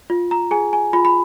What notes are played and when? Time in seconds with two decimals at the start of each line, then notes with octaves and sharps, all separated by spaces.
0.10 F4
0.31 A#5
0.51 G#4 G#5
0.73 G#5
0.93 F4 B5
1.05 B5